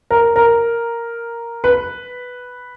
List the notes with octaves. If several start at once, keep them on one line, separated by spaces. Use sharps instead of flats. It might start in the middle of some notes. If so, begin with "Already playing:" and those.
A#4
A#4
B4